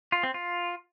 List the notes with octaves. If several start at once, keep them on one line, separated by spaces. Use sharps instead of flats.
F4
C4
F4